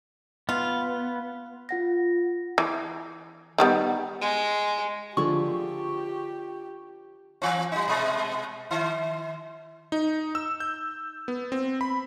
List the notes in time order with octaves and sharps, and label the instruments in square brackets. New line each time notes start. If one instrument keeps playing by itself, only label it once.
[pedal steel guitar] B3 [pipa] F4
[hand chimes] F4 F#5 A#6
[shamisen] E3
D#3 G3 B3
[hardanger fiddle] G#3
[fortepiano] D3 F3 [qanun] D4 F4 G#4 [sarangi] G4 [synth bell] C#6
[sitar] E3 C4
G3 D#4
B2 G#3
D#3
[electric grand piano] D#4
E6
G6
B3
C4
B5